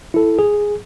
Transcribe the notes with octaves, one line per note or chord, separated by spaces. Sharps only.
E4 A4
G#4